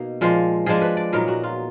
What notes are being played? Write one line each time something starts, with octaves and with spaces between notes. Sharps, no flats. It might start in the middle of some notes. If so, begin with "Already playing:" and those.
Already playing: B2 A#3 D#4
A#2 F3 G#3
F3 G#3 D4 G#4
B4
D5
A#2 F#3 B3 D#4 A#4
F#4
F4